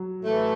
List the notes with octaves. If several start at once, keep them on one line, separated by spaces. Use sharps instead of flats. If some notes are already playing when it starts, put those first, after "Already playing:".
Already playing: F#3
A2 E3 A3